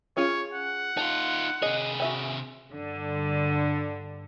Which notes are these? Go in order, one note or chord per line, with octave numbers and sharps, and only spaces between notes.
C#4 F4 G#4 C#5
F#5
D#4 F4 A5
C3 G#4 D#5
F#4 E5 G#5
G2 D3